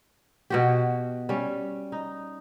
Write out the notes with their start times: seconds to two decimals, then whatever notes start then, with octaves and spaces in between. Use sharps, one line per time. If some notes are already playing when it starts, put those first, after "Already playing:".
0.50 B2 F#4 G4
1.29 G3 C#4
1.92 D#4